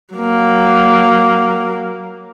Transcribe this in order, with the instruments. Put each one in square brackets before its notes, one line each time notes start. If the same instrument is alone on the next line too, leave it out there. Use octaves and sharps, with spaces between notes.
[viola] F#3 A#3